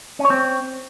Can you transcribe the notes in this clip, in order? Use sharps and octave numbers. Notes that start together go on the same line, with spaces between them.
C#4
C#5
C4